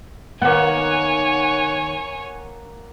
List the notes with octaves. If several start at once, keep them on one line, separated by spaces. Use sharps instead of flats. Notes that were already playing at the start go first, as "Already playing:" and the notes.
D#3 A#3 B3 C#5 F#5 G#5